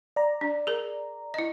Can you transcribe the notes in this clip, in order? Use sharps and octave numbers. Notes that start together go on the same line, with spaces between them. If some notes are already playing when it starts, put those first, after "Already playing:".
D5 A#5
D4
G#4 A#4
E4 D#5